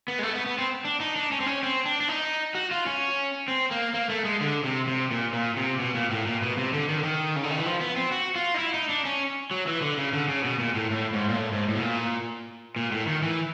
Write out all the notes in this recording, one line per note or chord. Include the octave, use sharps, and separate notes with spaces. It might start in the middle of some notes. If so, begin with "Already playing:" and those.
B3
G#3
A3
B3
B3
C4
D4
D#4
D4
C#4
C4
C#4
C4
D4
D4
D#4
F#4
F4
C#4
C4
A#3
A#3
A3
G#3
D3
C3
C3
A#2
A#2
C3
B2
A#2
A2
A#2
B2
C3
D3
D#3
D3
D#3
C#3
D3
D#3
E3
F3
B3
C4
F#4
F4
D#4
E4
D#4
D4
C#4
F#3
E3
D3
C#3
D3
C#3
B2
A#2
A2
A2
G#2
A#2
A2
G#2
A2
B2
A#2
A#2
A2
D#3
E3